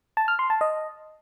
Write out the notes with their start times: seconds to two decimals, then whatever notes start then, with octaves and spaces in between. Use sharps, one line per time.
0.17 A5
0.28 F6
0.39 C6
0.50 A5
0.61 D#5